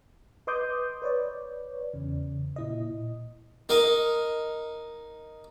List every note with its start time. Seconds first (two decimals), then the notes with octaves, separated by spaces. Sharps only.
0.47 B4 D#5 C6 D6 D#6 G6
1.02 B4 C#5 D5
1.93 E2 C#3
2.56 A#2 E4 D#5
3.69 D#4 A#4 D#5 F5